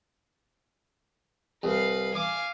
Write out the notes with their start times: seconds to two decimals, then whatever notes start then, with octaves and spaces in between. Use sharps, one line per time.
1.63 C2 B4 F5
2.15 F5 G#5 D6